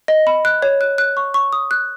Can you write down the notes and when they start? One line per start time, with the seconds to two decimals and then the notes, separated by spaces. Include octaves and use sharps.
0.08 D#5
0.27 B5
0.45 F#6
0.62 C#5
0.81 F#6
0.98 F#6
1.17 C#6
1.34 C#6
1.53 D#6
1.71 F#6